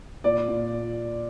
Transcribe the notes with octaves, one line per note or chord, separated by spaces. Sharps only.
A#2 D5
A#2